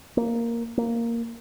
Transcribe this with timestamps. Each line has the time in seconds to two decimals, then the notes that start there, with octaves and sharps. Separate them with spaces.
0.17 A#3
0.78 A#3